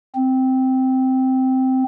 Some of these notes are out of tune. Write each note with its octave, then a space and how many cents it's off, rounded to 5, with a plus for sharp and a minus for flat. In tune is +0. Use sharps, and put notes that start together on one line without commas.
C4 -5